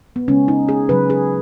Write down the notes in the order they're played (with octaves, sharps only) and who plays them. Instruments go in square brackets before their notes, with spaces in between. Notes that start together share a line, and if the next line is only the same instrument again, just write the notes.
[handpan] B3
C#3 G#3 C#4
D#4
G#4
C#3 F#3 B4
G#4